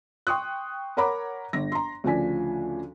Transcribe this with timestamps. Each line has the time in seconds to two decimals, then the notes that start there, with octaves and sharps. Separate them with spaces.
0.27 G5 C6 C#6 D#6 F#6
0.97 A#4 C#5 F#5 A#5 B5 D6
1.53 G1 A#6
1.72 A#5 C6
2.04 D2 C#3 F3 D4 G#5 B6